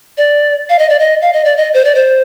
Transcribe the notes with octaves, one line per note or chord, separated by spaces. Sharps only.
D5
F5
D#5
D5
D#5
F5
D#5
D5
D#5
C5
D5
C5